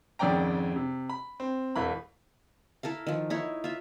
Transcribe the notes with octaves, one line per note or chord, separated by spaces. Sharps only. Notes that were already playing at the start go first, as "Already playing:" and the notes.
G#1 F2 C#3 D5 G5 A#5
C3
B5
C4
E1 E3 B5
E4 A4 A#4 F5
D#3 F3
D#4 E4 C#5
F4 E5